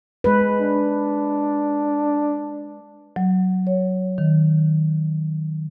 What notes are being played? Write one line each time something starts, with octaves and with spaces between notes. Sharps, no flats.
G#3 B4
D4
F#3
C#5
D#3